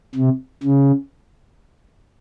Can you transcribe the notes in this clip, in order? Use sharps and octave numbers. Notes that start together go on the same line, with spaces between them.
C3
C#3